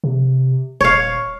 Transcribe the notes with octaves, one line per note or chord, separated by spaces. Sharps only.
C3
D#1 C#5 F5